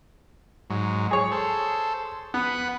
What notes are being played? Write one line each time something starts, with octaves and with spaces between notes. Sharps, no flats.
G#2 F#3
G#4 C#5
A4 C5
B3 B4 F#5